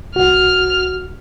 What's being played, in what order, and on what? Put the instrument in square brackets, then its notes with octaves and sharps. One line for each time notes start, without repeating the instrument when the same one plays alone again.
[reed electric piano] C2 F#4 [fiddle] F6